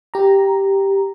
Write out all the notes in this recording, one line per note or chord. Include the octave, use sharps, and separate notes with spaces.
G4 A#5